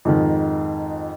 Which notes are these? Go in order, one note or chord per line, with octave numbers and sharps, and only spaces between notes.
F2 G#2 D#3